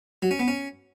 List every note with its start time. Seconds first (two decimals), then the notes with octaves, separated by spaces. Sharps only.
0.22 F#3
0.31 C#4
0.39 B3
0.48 C#4